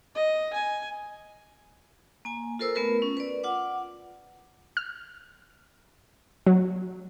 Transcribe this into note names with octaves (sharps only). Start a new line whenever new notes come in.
D#5
G#5
A#3 G#5
F4 A4 A#4 C5 E6
A3 B3 F4 A#4 B4
C#4
B4 D5
F4 F#5 D6
F6
F#3